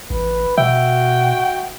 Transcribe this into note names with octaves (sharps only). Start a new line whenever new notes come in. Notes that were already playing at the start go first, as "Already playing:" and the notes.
A1 B4
B2 F#4 E5 G5